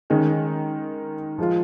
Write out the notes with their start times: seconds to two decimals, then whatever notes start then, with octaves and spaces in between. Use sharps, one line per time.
0.10 D#3 G#3 C#4
1.38 F3 G#3 F4